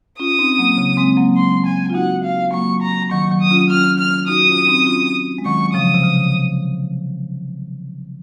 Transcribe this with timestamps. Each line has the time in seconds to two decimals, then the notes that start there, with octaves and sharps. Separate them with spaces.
0.20 C#4 F4 D#6
0.39 C4 D#4
0.58 F#3 A#3
0.77 C#3
0.97 G#3 C4
1.17 F#3 A#3
1.37 C6
1.66 G#5
1.90 F4
1.94 D#4 F#4 F#5
2.24 F5
2.53 F#3 A#3 C#6
2.83 A#5
3.11 D#3 F#3 C#6
3.31 D#3 F#3
3.41 D#6
3.51 C#4 F4
3.70 C#4 F4 F6
3.99 F6
4.28 D#4 F#4 D#6
4.48 C#4 F4
4.67 C4 D#4
4.86 C#4 F4
5.38 G#3
5.45 D#3 F#3 C#6
5.74 C#3 F3 D#6
5.94 C3
6.03 C#3